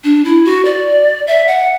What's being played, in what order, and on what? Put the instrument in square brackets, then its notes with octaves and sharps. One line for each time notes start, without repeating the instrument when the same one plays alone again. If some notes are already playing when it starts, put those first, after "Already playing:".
[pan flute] D4
E4
F#4
D5
E5
F#5